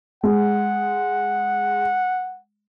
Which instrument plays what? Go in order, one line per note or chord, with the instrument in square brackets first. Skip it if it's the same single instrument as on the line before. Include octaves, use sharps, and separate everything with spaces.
[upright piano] G#3 [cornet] F#5